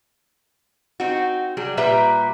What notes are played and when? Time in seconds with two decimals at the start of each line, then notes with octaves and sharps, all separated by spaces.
1.00 C4 D#4 F#4
1.57 F#3 G3 G#4
1.77 A#2 G3 G4 B4 E5 A#5